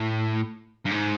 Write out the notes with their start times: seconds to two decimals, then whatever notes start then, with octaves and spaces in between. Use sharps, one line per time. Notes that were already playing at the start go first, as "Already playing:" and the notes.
Already playing: A2
0.86 G2
0.91 G#2